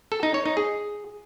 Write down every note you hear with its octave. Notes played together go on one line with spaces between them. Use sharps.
A4
D#4
C#5
D#4
G#4